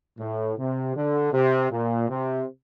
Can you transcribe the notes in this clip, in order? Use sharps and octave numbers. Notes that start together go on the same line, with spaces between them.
A2
C3
D3
C3
A#2
C3